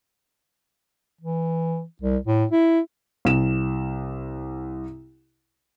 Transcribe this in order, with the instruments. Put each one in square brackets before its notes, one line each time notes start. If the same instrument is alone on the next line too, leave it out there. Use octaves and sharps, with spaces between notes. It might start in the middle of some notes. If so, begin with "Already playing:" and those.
[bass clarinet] E3
C2
A2
E4
[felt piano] C2 E7